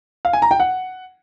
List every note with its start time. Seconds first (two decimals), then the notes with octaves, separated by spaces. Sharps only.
0.25 F5
0.33 G#5
0.42 A#5
0.51 G5
0.60 F#5